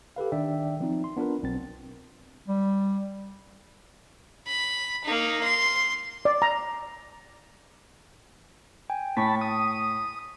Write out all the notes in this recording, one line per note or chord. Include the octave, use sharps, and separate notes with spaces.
G4 A4 B4 F5
D#3 D4 D5 E5 G5
F3 C4 D#4
C6
B3 D4 F4 A#4 B4
B1 C4 A6
G3
B5
A#3 D#4
C6
D5
A#5
G5 G#5
A2 A5 B5 C#6 B6
D#6